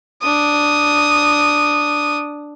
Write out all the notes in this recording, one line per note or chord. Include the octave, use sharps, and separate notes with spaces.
D4 D#6